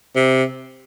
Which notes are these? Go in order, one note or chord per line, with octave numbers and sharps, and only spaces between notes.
C3